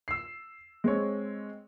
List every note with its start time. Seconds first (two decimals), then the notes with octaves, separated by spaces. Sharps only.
0.08 E6 C7
0.84 G#3 C4 C#5